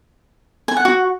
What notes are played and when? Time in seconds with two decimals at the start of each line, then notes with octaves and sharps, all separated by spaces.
0.68 G#5
0.77 F#5
0.85 F#4